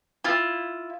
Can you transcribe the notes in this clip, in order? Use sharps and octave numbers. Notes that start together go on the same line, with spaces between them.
E4 F4